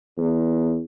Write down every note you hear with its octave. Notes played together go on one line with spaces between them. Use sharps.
E2